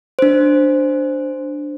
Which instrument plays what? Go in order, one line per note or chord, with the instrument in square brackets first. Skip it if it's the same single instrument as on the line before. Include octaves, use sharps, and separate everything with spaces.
[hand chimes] D4 C5